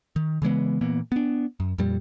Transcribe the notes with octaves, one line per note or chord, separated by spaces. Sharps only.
D#3
C#3 E3 G#3 B3
A#2 E3 A#3 B3
B3 D4
F#2
F2 A#2 G3